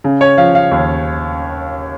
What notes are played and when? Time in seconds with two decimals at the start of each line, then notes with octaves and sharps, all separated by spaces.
0.04 C#3
0.21 C#5
0.38 F3 F5
0.55 F5
0.71 D#2